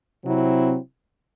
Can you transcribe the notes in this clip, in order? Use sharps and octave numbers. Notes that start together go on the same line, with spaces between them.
C3 F#3 C4 E4